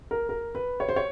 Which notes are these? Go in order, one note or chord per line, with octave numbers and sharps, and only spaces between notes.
A#4
A#4
B4
C#5
C5
C#5